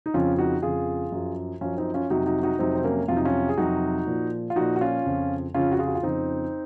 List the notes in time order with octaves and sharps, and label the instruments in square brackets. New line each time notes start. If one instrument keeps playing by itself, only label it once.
[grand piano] D#4
F2 C#3 F3 C#4 F4
D#4 F#4
F2 C#3 F3 F4 G#4
F#2 F3
F#2 F3 C#4 F4
C4 D#4
C#4 F4
F2 C3 F#3 D#4 F#4
D#4 F#4
D#4 F#4
F2 C3 F#3 C4 D#4
C4
A#3 C#4
F2 C3 F#3 F4
D#4
C#4 F4
G#4
F2 C3 F#3 D#4 F#4
A#2 F3
F4
A#2 F3 D#4 F#4
F#4
C#4 F4
F2 C#3 F3
F2 C#3 F3 C#4 F4
F#4
F4 G#4
F#4
F4
F2 C#3 F3 C4 D#4